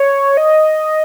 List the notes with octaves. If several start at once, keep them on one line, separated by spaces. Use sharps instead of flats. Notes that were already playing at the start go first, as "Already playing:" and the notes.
Already playing: C#5
D#5